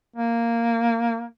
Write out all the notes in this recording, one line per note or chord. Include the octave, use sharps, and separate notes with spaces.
A#3